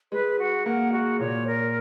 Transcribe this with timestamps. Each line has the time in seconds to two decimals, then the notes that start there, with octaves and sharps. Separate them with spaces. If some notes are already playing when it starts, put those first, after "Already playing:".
0.12 G#3 B4
0.39 F#4
0.66 A#3 F#5
0.92 G#3 F#4
1.20 A#2 C#5
1.47 A#4